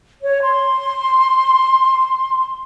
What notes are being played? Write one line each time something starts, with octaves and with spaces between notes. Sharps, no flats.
C#5
C6